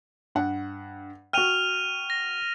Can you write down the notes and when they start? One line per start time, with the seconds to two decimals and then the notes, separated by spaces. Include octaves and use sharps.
0.35 G2 F#5
1.33 F#4 G5 F6 D#7 F7
2.10 A#6